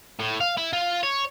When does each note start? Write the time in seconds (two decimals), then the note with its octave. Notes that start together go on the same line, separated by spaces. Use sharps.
0.20 A2
0.41 F5
0.58 E4
0.73 F4
1.03 C#5